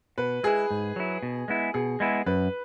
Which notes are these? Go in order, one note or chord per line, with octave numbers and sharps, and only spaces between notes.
B2 B4
G#3 E4 G#4
G#2
F#3 E4
B2
G#3 B3 E4
B2 G#4
G#3 B3 E4
F#2 B4